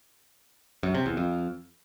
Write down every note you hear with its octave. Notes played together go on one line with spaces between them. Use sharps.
F#2
C3
E2
F2